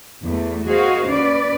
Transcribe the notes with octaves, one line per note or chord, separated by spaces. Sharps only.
E2 A3
F#4 G#4 A#4 C5 D#5 F5
D#2 C#4 B4 D5